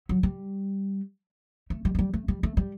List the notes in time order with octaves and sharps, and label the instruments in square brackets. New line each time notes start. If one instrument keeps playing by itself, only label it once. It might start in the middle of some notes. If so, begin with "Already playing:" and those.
[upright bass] F#3
G3
A3
G3
A3
G3
A3
G3
A3
G3